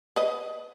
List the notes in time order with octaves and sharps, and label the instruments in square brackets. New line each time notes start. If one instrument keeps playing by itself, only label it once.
[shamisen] B4 D#5